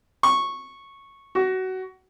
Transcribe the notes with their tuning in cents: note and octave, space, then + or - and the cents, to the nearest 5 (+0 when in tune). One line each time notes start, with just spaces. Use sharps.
C#6 -10
F#4 +20